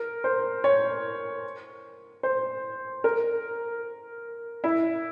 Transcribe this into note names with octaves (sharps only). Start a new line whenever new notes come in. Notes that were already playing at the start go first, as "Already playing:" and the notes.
Already playing: A#4
C5
C#5
C5
A#4
E4